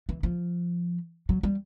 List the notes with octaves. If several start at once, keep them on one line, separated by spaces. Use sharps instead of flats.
E3
F3
F#3
G3